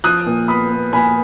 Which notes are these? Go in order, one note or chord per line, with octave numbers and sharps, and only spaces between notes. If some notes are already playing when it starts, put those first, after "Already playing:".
F3 D#6 F#6
A#2
B3 B5 D#6
B3
A#2 G#5 B5